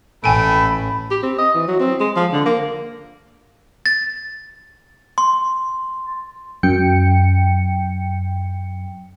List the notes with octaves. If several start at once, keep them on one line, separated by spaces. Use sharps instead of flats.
A1 A3 G5 G#5 B5 D7
G4
C4
D#5
E3
F#3
C4
G#3
F3
D3
A#3
A6
C6
F#2 G5 C#7